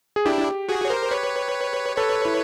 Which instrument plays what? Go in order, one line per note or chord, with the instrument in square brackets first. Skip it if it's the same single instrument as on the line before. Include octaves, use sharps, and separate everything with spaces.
[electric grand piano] G#4
[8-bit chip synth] D4 E4 [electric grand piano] G4
[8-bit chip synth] F#4 G#4
C#5
A#4 C5
B4 C#5
[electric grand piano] A4 [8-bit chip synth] B4 C#5
[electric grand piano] E4